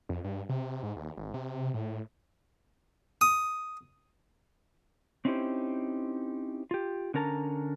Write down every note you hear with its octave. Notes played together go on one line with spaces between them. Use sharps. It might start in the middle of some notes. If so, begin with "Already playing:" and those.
F2
G2
C3
G#2
D#2
G#1
C3
A2
D#6
C4 C#4 D#4 E4 G4 C5
F4 G4
D3 C#4 A#4 A5 A#5